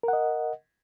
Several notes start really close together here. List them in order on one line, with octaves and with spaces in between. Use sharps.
A#4 F#5 D#5